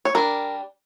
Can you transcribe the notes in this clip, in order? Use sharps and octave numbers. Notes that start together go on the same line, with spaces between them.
C#5
G3 D4 A#4